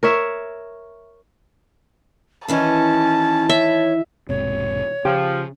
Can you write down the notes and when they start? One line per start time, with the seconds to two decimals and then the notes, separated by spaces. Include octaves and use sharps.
0.03 A#4 C#5 E5
2.48 D#3 E3 C#4 E4 A5
3.49 C#5 E5
4.29 E1 G#2 C3 C#5
5.05 C#3 F3 G4 G5